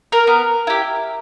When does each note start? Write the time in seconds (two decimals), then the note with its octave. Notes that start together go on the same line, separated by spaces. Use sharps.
0.12 A#4
0.27 B3
0.67 E4 G4